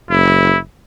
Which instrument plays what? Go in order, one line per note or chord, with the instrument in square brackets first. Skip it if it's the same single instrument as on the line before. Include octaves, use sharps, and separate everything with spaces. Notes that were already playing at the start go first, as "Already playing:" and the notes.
[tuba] F#1 [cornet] E4